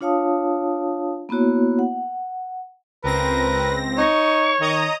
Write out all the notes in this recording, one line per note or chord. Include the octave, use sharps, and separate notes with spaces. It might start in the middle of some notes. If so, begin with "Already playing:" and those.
D4 F4 C#5 F5 A5 D#6
A#3 B3 E4 F#4 C#5
F#5
C#2 C4 A#4 B4 A#6
D#4 C#5 C#6
D#3 D#5 A#5 D#6